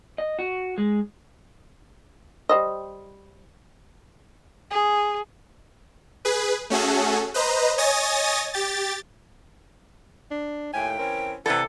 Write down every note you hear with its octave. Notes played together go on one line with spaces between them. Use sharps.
D#5
F#4
G#3
G3 C5 D#5
G#4
G#4 B4
A3 C#4 F#4 G#4 A4
B4 C5 D#5 A#5
C#5 D#5 G#5 D#6 A6 A#6
G4 A6
D4
D#2 A2 G5 G#5
E3 C4 C#4 A#4
C3 E3 A4 D5 F#5